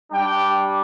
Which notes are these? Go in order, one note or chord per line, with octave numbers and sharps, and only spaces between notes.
G3 D4 G4 G5